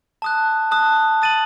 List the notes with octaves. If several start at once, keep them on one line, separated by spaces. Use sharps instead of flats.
A5 D#6 F#6
A5 D#6 F#6
D#6 A6 D#7 F#7